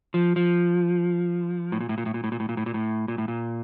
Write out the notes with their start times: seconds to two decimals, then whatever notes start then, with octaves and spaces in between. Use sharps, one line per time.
0.14 F3
0.36 F3
1.72 A2
1.81 A#2
1.89 A2
1.98 A#2
2.06 A2
2.14 A#2
2.24 A2
2.32 A#2
2.40 A2
2.49 A#2
2.57 A2
2.66 A#2
2.74 A2
3.08 A#2
3.18 A2
3.28 A#2